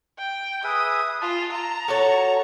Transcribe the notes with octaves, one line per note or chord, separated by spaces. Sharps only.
G5
G#4 B4 E5 D#6
F4 A5
A#5
F#4 A4 C#5